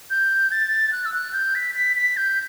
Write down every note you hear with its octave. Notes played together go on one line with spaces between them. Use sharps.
G6
A6
F#6
E6
F#6
G6
B6
B6
B6
G6